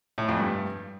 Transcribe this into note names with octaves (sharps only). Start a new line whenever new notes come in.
A2
F2
G2